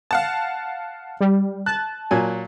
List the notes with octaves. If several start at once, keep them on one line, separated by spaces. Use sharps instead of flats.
F5 F#5 A5
G3
A5 F#6
A#2 F#3 G#5